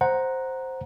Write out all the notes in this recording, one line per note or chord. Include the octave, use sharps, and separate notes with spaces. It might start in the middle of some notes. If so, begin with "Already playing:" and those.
C5 F#5 A#5